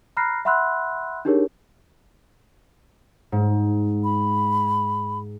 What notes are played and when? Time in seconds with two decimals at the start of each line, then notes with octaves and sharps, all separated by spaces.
0.17 A#5 B5 F6 F#6 A#6 C7
0.45 E5 F#5 B5 C6 E6 F#6
1.25 D4 D#4 G4 G#4 A#4 C#5
3.32 G#2
4.04 B5